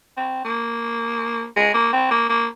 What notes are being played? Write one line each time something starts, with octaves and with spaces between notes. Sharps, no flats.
C4
A#3
G#3
A#3
C4
A#3
A#3